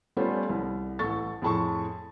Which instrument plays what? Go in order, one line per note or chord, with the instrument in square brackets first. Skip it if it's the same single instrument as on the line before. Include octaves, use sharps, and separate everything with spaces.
[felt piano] G3 A3 B3 C#4 F4 C5
C2
A1 A4 C#6 A6
F2 A2 G#4 A5 C6 C#6